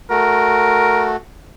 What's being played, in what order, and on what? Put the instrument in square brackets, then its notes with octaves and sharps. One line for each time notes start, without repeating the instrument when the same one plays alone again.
[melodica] A3 F#4 [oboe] A#4